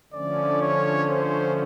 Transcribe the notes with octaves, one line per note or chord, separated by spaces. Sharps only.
D3 F3 A3 C#4 D5
C#5
C5